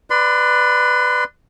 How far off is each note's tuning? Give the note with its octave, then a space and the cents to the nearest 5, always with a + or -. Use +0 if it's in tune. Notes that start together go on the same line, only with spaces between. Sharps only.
B4 +0 D5 +15 C6 -35